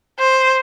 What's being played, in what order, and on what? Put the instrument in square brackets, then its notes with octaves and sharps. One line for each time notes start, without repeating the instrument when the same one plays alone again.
[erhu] C5